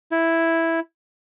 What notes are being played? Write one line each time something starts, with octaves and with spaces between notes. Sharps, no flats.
E4